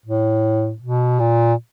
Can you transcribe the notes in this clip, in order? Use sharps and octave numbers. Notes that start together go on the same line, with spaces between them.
A2
B2
A#2